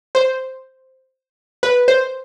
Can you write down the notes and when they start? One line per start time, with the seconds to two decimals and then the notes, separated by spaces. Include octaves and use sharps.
0.15 C5
1.63 B4
1.88 C5